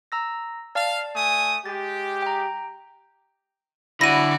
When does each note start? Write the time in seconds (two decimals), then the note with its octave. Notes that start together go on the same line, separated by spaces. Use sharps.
0.12 A#5 E6 A#6
0.75 D5 F5 A5
1.16 A3 G#5 D#6
1.66 G#3 G4 A6
2.22 G5 A#5
4.01 D3 E4 F#4 D5 B5 A#6 D#7